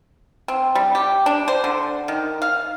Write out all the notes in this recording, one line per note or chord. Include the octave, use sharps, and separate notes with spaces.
C4
G3
G4
D4
C5
D3
D#3
F5